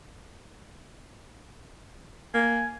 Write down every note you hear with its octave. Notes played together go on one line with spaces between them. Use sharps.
A#3 G#5